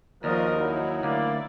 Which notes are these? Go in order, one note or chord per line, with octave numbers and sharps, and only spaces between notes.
D#2 F3 F#4 A#4 D5 D#5
F#3 D#4 E4
D2 A#3 E4 D5